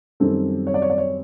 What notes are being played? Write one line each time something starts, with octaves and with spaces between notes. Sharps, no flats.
F#2 D#3 G3 C4 A4
C#5
D5
C#5
D5
C#5